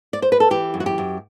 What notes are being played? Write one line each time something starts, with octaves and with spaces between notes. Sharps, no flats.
D5
C5
B4
A4
E3 G4
F#2
F#4
G4
F#2